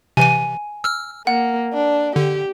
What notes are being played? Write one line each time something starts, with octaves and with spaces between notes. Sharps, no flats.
C3 E3 G#5 D#7
E6 F6
A#3 F#5
D4
D3 G4